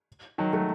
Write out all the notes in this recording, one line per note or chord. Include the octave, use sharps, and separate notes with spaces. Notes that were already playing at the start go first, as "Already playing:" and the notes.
D#3 F#3
F#3 A3